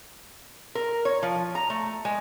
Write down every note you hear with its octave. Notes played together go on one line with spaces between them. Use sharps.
A#4
C#5
F3
A#5
A3
G#3